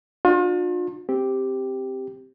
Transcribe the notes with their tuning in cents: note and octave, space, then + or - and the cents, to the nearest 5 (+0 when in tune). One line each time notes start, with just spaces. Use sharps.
D4 +35 F4 +40
C4 +0 G4 +0